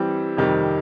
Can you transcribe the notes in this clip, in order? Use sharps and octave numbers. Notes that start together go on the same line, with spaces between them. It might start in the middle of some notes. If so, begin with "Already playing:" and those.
Already playing: E3 G3 C4
F2 C3 D#3 G3